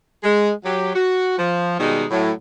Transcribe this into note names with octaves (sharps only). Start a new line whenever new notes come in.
G#3
F#3 G4
F#4
F3
B2 D#3 G3 G#3 D#4 G#4
A2 F#3